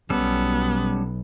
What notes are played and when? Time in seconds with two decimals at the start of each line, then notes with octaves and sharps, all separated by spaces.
0.10 B1 G3 B3 C#4 A4